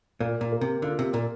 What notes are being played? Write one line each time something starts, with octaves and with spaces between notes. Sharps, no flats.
A#2 A#3
A#2
A#3
C3
D3 F4
C3
A#2 A#3